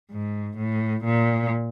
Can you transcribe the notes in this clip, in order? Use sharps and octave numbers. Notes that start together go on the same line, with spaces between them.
G#2
A2
A#2